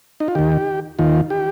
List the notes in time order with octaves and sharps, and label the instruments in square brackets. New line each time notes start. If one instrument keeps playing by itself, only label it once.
[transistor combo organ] D#4
F4
D#2 D#3 G4
D#2 D#3 F4
G4